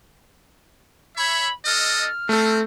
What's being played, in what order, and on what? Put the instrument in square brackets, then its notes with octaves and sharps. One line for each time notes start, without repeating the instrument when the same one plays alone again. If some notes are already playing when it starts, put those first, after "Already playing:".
[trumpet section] C#5 E5 [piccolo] B5
[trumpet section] D4 A4 D#5 [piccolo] F6
[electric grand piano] A3 A4 [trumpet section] C4